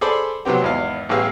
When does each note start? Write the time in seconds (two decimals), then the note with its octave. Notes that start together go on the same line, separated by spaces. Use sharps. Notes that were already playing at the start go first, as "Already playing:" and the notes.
0.01 G#4 A4 C5 D5 B5 D6
0.45 C3 F#3 B3 C4 G4
0.62 G#1 E2 F5
1.09 A1 G3 B3 G#4 F5 E6